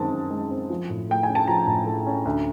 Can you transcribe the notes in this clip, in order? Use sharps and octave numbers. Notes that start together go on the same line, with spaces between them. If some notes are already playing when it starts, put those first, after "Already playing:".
Already playing: F#2 D#3 G#3 C4 A5
F#2
G#3
C4
F3
A2
A3 G5
G#5
C#4
A5
F3 A#5
A2
A3
C#4
D2